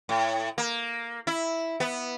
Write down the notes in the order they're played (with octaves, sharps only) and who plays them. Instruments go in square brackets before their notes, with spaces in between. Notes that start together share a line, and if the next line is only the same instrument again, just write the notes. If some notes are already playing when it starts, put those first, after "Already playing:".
[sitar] A2
A#3
E4
B3